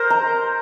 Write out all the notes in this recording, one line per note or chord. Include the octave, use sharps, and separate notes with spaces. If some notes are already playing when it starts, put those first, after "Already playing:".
Already playing: A#4 C5
A#5